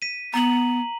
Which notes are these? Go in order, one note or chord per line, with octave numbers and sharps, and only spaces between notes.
B6 D#7
B3 A#5 F#7